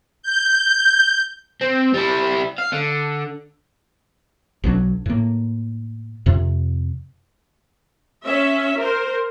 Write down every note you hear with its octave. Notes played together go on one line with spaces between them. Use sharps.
G6
C4
G3 E4
F5
D3
B1 F#3 D4
A2 A#3
F2 C3
C#4 E5
A#4 C5